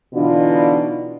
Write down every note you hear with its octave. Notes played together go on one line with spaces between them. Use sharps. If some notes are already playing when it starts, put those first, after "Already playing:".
B2 D3 E3 D4 D#4 F4